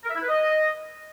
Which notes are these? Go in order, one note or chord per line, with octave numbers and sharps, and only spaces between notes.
A#4
E5
E4
B4
D#5